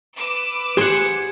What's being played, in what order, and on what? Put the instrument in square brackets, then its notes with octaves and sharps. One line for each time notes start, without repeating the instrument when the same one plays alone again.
[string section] B4 D6 E6
[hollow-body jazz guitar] G4 C6 [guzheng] G#4 C5 F#5